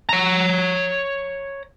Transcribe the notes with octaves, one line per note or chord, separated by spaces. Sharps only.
C#5 A#5